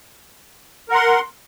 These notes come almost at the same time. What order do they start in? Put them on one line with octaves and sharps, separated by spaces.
A#4 F#5 C6